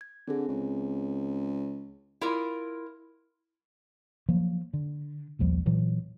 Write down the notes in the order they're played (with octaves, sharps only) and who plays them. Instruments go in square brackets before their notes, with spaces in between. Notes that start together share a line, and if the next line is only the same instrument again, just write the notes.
[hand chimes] G#6
[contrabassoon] D3 [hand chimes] C4 G#4
[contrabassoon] C#2
[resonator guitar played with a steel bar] E4 F4 A#4
[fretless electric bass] F3 F#3 A#3
D3
A#1 D#2 F3 G3
A#2 E3 F#3